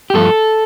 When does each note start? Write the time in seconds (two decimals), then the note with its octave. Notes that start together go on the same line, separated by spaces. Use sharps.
0.10 G4
0.14 G2 F3 A3 A4